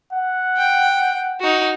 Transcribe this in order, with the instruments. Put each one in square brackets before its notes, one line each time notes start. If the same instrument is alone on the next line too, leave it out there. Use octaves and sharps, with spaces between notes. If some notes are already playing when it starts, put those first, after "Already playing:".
[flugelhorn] F#5
[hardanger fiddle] G5
D#4 F#4